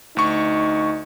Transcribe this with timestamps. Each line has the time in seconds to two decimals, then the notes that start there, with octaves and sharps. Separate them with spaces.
0.17 D2 D#4 C#6